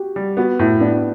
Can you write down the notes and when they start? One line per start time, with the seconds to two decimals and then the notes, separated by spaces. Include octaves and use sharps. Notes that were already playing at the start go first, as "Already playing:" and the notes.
Already playing: F#4 G4
0.16 G3
0.37 B3 F#4
0.59 A2 E4
0.80 B3 D4